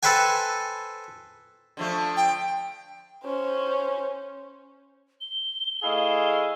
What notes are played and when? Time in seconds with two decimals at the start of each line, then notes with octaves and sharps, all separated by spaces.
0.03 A4 B4 C5 G5 G#5
1.77 D3 F3 A3
2.16 G5
3.24 C#4 C5
5.21 G7
5.83 A3 E4 G#4 D#5 F5